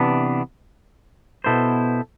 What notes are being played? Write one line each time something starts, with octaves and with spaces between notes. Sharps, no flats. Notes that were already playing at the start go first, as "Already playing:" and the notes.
Already playing: C3 E3 B3 D4
B2 B3 E4 A4 C5